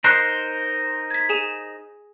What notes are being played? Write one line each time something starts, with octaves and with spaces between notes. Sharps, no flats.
D#4 A#4 C5 F#6 C7
G#6 B6
G#4 G#5 E7